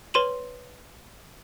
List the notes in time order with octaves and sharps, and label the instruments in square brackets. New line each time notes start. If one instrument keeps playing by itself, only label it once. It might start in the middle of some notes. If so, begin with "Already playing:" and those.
[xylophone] B4 C#5 C6 D#7 E7 F#7